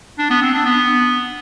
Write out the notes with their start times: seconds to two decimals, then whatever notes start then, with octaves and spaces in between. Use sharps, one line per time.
0.19 D4
0.30 B3
0.42 C4
0.54 D4
0.65 B3